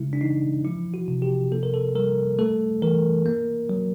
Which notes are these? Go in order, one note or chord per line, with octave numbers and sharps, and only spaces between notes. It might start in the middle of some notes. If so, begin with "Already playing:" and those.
Already playing: C#3 G#3 E4
D4
E3 D#4
F3 E4
F#4
C3
G4
A#3 A4
A#4
A4
G3 A#4
A3 A4
E3 A#4
A#3
F#3